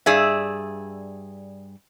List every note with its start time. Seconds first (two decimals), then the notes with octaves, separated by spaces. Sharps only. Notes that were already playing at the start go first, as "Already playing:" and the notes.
0.06 G2 G#4 D5 E5